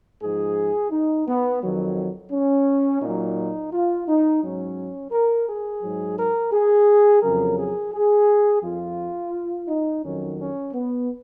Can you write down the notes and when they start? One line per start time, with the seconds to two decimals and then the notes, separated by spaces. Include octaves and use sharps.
0.21 G#2 F3 G#4
0.90 D#4
1.27 B3
1.61 F2 D#3 F#3
2.31 C#4
3.02 A#2 F#3 D#4
3.72 F4
4.07 D#4
4.41 G#2 F#3 C#4
5.11 A#4
5.47 G#4
5.82 G#2 F#3
6.17 A#4
6.51 G#4
7.22 F2 C#3 F#3 A#4
7.58 G#4
7.92 G#4
8.62 F2 F3 F4
9.67 D#4
10.02 F2 D#3 F#3 C#4
10.38 C#4
10.73 B3